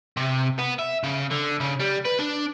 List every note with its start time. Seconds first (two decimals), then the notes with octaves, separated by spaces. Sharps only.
0.17 C3
0.59 B3
0.79 E5
1.03 C#3
1.31 D3
1.61 C#3
1.80 G3
2.05 B4
2.19 D4